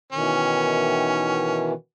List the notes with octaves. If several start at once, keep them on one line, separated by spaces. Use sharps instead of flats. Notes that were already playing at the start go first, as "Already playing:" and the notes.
B2 D#3 E3 C#4